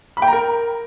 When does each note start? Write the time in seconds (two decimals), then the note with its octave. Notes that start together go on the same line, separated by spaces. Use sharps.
0.17 B5
0.22 G5
0.27 A#5
0.33 A#4